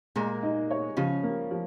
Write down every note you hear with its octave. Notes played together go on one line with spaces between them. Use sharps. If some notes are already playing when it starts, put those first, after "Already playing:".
A#2 G#3 A#3
D#4
C#5
C#3 F3 C#4
A#3
F3